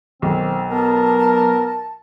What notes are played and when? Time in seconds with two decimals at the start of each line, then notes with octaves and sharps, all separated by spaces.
0.22 B1 D#3 C4
0.71 B3 A#4 A5